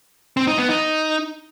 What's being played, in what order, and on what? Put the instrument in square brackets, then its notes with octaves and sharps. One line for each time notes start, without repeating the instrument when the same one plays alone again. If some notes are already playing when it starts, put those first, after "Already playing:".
[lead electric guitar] C4
D#4
B3
D#4